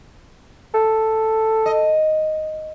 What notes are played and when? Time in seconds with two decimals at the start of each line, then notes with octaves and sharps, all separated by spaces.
0.74 A4
1.66 D#5